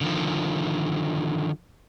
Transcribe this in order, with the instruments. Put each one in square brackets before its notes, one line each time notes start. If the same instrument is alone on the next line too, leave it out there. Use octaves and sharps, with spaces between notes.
[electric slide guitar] D3 D#3 F3